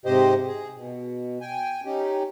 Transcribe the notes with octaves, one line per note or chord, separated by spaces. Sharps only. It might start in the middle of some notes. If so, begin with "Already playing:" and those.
G#2 C3 G4 C5 D#5
G#4
B2
G5 G#5
C#4 D#4 G4